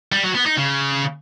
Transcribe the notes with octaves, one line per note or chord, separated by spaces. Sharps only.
G3
F#3
B3
D#4
C#3